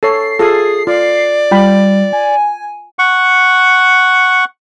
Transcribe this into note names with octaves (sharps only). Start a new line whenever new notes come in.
A4 C#5 C7
F4 G#4 A4
F4 D5
G3 F4 G5 B5
G#5
F#5 C#6